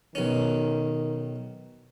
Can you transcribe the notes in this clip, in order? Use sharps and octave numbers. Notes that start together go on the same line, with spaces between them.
B1 D#3 C#4